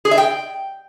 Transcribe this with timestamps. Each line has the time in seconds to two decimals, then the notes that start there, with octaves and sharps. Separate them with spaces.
0.05 G#4
0.11 E5
0.18 G5